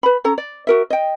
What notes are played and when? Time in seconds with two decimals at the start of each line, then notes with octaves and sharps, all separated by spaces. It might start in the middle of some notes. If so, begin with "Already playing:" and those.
0.03 B4 B5
0.24 C#4 A4 A#5
0.38 D5
0.67 F#4 A#4 E5
0.90 D#5 G5